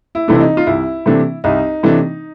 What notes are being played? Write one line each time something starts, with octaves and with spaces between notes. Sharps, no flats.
E4
C3 E3 A3 D4
E4
D#4
F4
C2 E4
C3 E3 A3 D4
C2 D#4
C3 E3 A3 D4